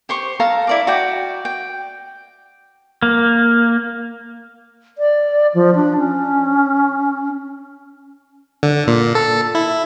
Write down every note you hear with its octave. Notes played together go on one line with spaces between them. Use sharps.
G4 C5 C#6
A4 F5 A5 A#5
E4 D5 D6
F#4 D5 G5
G5
A#3
D5
F3
D4
C#4
D3
A#2
A4
E4